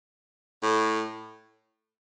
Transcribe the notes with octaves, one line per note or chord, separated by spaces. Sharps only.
A2